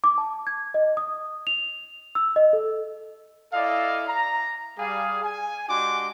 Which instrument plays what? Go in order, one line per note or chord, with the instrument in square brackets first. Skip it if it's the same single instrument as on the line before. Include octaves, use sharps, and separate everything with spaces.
[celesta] D6
A5
G#6
D#5
D#6
F7
E6
D#5
A4
[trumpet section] E4 A4 D5 D#5 F5
A#5
G3 G#4 F5
G#5
G#3 D4 F#4 G4 C6 D6